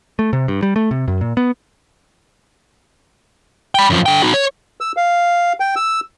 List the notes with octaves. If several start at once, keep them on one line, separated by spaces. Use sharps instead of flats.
A3
C3
G2
G3
A3
C3
F#2
A#2
B3
G5 B5
F#2 F3
D3 G5
D#4 F#4
C#5
E6
F5
G5
E6